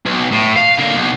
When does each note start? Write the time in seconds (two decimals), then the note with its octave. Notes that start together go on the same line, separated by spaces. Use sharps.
0.06 B1
0.33 A2
0.57 F5
0.79 D3 A#3
0.95 B1